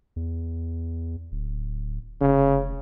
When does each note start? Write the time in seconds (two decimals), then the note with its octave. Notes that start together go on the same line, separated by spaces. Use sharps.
0.16 E2
1.32 D1
2.21 F1 C#3